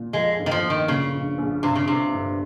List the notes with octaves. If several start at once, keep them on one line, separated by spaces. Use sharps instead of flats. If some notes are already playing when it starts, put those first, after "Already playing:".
Already playing: A#2
F2 G#3
G1
D#3
F3
G1
D#3
A#2 C#3
A#1
A#1
G2 C3
C#3
G1 C3
G1